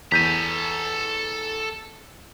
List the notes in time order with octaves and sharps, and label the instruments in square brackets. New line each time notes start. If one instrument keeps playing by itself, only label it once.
[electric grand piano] E2 G6 D#7 [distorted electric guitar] A4 A#5 [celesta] B6